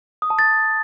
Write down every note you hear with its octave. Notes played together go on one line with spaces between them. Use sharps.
D#6
A5
A6